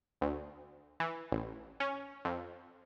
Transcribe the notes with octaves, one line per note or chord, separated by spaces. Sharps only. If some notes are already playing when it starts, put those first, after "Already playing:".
D2
E3
A1
C#4
F2